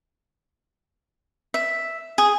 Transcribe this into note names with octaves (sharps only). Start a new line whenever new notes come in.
E5
G#4